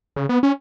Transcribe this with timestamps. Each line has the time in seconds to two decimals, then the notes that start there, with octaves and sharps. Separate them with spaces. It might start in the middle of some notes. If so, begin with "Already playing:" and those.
0.16 C#3
0.29 B3
0.43 C#4